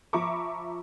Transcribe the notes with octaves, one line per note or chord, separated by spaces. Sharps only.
F3 E5 A#5 B5 C#6 D6